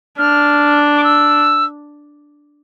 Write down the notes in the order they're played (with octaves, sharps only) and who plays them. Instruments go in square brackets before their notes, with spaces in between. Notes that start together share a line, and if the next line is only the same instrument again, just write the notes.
[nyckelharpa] D4 [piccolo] F6
[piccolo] D6
E6